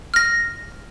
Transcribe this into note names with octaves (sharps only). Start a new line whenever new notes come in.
F6 A#6